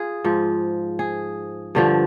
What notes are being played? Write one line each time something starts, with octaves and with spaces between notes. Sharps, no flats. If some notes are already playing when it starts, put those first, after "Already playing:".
Already playing: F4 G#4
G#2 F3
G#4
G2 D3 F3